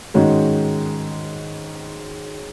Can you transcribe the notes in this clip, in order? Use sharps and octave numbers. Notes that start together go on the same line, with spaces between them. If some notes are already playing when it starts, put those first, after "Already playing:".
G#2 D#3 G#3 C#4 F#4